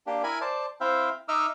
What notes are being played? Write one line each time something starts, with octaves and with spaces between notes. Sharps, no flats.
A#3 D4 G4
E4 A#4 G#5 B5
C5 D5 A5
C4 E4 C5 E5 F5 G5
D#4 D#5 E5 D6 E6 F6